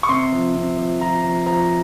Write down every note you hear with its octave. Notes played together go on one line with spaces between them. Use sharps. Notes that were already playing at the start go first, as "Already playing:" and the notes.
C#6
C3 C6
F3
C3
F3
F3 A#5
F3
F3 A#5